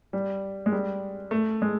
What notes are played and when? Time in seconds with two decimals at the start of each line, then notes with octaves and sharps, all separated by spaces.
0.13 G3
0.66 G#3
0.72 G3
1.31 A3
1.62 G#3